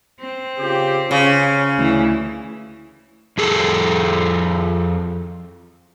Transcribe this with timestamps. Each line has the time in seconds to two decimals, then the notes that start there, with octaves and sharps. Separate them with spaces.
0.20 C4
0.59 C#3 F4 G4
1.11 C#3 C#4
1.77 D2 E3
3.38 F2 G#4 A4